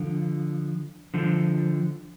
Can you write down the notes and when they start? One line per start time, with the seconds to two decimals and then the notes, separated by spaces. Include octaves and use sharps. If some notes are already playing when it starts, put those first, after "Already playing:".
Already playing: D3 F3
1.14 D3 F3